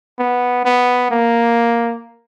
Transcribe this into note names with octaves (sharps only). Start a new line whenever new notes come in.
B3
B3
A#3